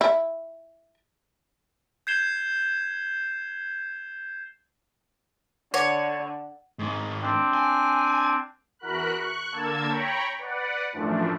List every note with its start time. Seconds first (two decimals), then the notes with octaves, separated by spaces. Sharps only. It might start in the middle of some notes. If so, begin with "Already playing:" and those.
0.01 E4
2.07 G6 G#6 C7 E7 G7
5.74 D3 C#5 F#5
6.79 G#2 D#3
7.22 C4 D4
7.53 G#5
8.79 E2 F#4 A#4 B5 F#6
9.15 C#6 F#6
9.52 D3 A#3 A5 E6 G#6
9.88 C#5 G5 A#5 B5 C#6
10.38 B4 D5 F#5
10.92 F#2 A2 E3 F3 A3 D4